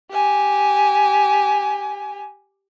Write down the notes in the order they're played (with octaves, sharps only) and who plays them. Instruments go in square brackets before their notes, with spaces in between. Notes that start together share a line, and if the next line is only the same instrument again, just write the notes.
[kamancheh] G4 G#5